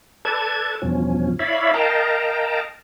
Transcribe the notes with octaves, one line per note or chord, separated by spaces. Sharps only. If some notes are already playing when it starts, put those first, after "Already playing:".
A4 B4 D5 A5 G#6
E2 G2 B2 F3 C#4
E4 C#5 D5 E5 F5 B5
A#4 D#5 F5 G5 A5 A#5